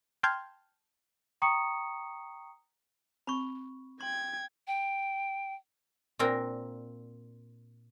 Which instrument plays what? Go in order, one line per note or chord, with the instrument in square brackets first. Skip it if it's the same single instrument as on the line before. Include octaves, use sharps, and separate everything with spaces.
[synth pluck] G5 A5 C6 F6 G6 G#6
[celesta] G5 A#5 C#6 D#6 C#7
[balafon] C4 [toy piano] B5 C#6
[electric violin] G5 G#6 [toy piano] C6
[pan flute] G5
[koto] A#2 A#3 C4 D4 A#4